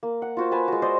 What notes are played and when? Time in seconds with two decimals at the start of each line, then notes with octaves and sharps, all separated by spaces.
0.03 A#3
0.22 F#5
0.37 F4 F#4 C5
0.51 B4 G#5 A5
0.68 G#3 F#4
0.82 C5 D5 D#5